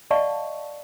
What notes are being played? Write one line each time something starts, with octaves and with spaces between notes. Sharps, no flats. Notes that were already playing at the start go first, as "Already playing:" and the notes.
D5 D#5 F5 F#5 A5 C#6